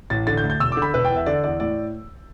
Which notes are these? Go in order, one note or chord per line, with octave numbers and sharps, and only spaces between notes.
A1 A6
D3 A6
G6
D2
G6
E1 E6
D6
D3
B5
E1 B4
G5
E2
E5
D3 D5
E2 D5
A2 D5